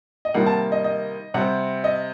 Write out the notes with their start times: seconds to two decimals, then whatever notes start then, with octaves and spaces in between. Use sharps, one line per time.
0.25 D#5
0.34 C3 D#3 G3 A#3 F#5
0.46 A5
0.72 D#5
0.84 D#5
1.34 C3 G3 C4 F#5
1.84 D#5